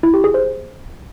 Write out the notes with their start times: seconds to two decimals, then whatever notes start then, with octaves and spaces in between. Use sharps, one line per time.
0.03 E4
0.14 G4
0.24 G#4
0.34 C5